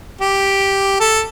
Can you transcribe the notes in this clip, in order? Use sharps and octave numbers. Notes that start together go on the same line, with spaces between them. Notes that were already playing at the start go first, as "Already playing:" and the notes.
G4
A4